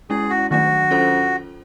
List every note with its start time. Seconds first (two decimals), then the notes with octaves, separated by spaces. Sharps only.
0.10 G#3 C#4 E4 G#4
0.30 F#4
0.51 D#3 F#3 A3 D4 F#4
0.91 C#4 F4 A4 C5